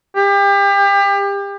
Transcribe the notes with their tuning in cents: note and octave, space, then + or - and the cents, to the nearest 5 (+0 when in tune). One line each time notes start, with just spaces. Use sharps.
G4 +30